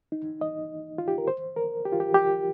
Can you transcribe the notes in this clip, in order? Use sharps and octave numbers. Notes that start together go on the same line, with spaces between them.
D#4
D#5
F4
G4
A#4
C5
A#4
G4
F4
G4
G4